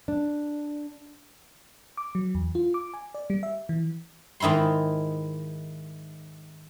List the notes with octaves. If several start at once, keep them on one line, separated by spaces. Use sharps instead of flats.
D4
D6
F#3
E2
F4
D6
G#5
D5
G3
E5
E3
G#2 D#3 E4 B5 C6